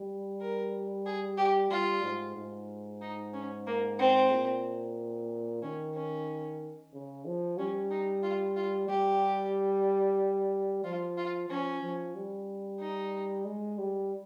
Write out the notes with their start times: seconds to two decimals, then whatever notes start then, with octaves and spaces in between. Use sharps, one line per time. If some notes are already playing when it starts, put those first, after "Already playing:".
Already playing: G3
0.41 A#4
1.06 G#4
1.38 G4
1.71 G3 F4
2.04 G#2
2.36 G#2
3.02 D#4
3.33 C#4
3.67 A#3
3.99 C4
4.31 A#2
5.62 D#3 C#4
5.94 C#4
6.93 C#3
7.25 F3
7.58 G3 C#4
7.91 D#4
8.23 F4
8.56 F4
8.89 G3 G4
10.84 F3 F4
11.17 F4
11.49 F3 C#4
11.82 F3
12.15 G3
12.80 D#4
13.45 G#3
13.78 G3